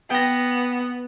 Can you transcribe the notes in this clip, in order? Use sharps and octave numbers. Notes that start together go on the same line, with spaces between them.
B3 G5 A#6